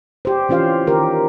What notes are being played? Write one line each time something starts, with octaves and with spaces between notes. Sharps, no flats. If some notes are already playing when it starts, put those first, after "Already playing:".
G4 C5
E3 C#4 F4 C5 F5
D#3 F4 G4 A#4